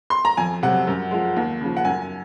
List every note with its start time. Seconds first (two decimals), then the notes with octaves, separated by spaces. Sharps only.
0.10 C6
0.25 A#5
0.37 F2 G#5
0.63 C3 F#3 F#5
0.87 F#2
1.11 F3 G#3
1.36 D#2
1.61 C#3 F3
1.77 F#5
1.85 F#2 G#5